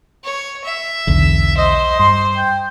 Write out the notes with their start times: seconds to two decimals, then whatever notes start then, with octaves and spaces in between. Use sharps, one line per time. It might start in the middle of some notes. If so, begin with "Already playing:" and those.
0.24 C#5
0.64 E5
1.07 B1 E2 D3
1.58 C5 D#5
1.99 G2 C6
2.37 G5